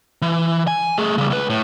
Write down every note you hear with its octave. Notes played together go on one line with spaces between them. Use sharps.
E3
G#5
A3 G#4
C#3 G3
C#2 B4
A2